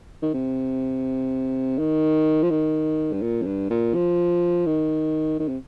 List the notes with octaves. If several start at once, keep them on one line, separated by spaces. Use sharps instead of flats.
D#3
C3
D#3
F3
D#3
G2
A#2
F2
G2
A#2
F3
D#3
D#3
C3